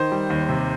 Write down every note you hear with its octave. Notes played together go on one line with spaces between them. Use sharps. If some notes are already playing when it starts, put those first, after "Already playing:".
Already playing: D#3 C5
G3
D#2
C3